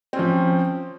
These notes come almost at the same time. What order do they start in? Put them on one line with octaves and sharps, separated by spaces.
C4 C#4 F3